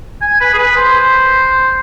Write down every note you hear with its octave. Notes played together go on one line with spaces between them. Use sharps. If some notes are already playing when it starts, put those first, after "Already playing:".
G#5
B4
G#4
B4
C5